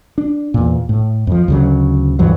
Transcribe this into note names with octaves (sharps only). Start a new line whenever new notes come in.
D4
E2 A#2
A2
F2 F3
D2 C#3 F#3
D2 G2 E3 F#3